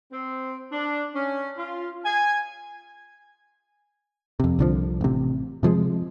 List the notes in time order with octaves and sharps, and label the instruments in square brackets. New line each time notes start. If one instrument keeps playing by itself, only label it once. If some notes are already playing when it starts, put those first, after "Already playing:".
[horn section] C4
D4
C#4
F4
G#5
[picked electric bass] F2 C3
C2 D3 F3
A1 C3
C3 F3 F#3 G#3